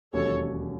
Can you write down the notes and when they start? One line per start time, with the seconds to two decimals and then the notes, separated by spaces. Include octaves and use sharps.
0.13 E1 D#2 D#3 F#3 C#4 A4 C#5